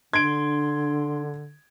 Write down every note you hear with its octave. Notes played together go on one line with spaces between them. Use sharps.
D3 D4 C6 G#6 D7